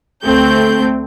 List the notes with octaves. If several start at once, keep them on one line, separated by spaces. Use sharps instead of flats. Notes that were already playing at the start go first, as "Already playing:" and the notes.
D2 A3 C4 G6